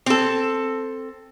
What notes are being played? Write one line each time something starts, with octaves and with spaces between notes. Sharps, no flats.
C4 A4